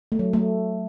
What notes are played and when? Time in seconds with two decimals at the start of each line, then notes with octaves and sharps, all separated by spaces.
0.12 A3
0.19 F#3
0.33 A3